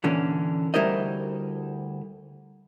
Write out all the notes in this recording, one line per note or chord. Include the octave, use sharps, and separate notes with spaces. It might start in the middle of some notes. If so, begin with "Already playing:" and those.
A#2 D3 E3 C#4
D2 G3 E4 A#4 C5 D#5